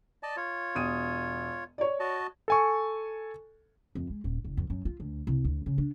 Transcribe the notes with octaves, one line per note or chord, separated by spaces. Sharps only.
D5 D#5 A5
F4 C#5
E1 D#6 D#7
C#5 D5
F#4 D#5 A5
A4 G#5 C#6
F2
G#3
D#1
F#1
F2
F#2
F4
D2
C2
D2
C#3
D4